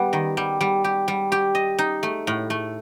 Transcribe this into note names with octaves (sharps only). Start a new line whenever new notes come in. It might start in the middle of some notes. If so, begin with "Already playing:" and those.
Already playing: G3 B3
D#3
G3
G3
G4
G3
G4
D#5
D#4
A3
A2
A3